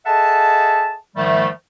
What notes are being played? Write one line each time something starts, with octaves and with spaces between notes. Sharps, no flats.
G#4 A4 D#5 E5 F#5 A5
G#2 D#3 F3 G3 A3